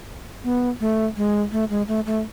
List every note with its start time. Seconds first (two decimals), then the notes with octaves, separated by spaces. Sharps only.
0.44 B3
0.80 A3
1.17 G#3
1.52 A3
1.70 G#3
1.88 A3
2.06 A3